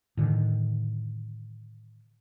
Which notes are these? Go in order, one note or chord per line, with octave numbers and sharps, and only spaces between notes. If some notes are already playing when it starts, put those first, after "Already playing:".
A2 D3 D#3